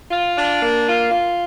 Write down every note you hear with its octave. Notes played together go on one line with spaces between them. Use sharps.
F4
D4
A#3
F4
F4